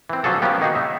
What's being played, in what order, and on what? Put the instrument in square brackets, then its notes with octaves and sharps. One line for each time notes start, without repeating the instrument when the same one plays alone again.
[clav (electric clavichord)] E3 C4
D3 F3 F#3 G#4 A4
F3 F#3 A#3 B3 C#4 G4
D#3 A#3 D#4 F#4 G#4
E5